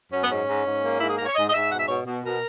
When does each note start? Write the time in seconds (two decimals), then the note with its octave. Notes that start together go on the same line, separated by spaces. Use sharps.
0.11 F#2 C#4
0.23 B3
0.29 G#2 C#4
0.46 G#2
0.64 G#2
0.82 A#3
0.99 G#2 E4
1.08 G#4
1.17 G#2 A#4
1.25 C#5
1.34 G#2 D#5
1.48 D#5
1.52 G#2 E5
1.70 B2 F#5
1.78 E5
1.87 B2 C#5
2.05 B2
2.22 B2 A#4